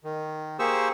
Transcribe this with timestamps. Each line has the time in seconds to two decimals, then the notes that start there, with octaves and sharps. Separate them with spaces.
0.04 D#3
0.59 A#3 G4 G#4 C5 C#6 E6